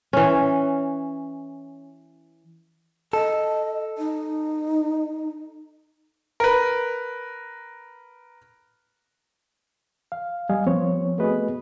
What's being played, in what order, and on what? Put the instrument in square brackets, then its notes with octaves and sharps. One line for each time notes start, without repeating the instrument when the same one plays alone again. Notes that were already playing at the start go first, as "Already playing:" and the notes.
[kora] E3 C#4
[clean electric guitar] A4 [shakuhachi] D#5
[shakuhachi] D#4
[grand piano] A#4 B4
[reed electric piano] F5
G3 D#5 F5 G#5
F3 B3 C4 C5 C#5
A3 B3 F#4 G#4 B4 D#5